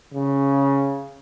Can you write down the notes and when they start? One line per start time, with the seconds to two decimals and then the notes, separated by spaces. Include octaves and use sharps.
0.14 C#3